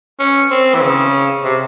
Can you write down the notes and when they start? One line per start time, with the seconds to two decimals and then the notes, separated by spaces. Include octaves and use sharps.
0.20 C#4
0.51 C4
0.74 E3
0.81 C#3
1.44 C3